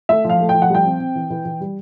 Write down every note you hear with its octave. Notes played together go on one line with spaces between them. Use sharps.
A3 E5
F3
F5
A3
G5
F3
F#5
G3
G5
C4
C4
E3
E3
E3
G3